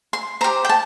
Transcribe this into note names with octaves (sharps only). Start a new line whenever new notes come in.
C6
G4 C5 A#5
G5
A5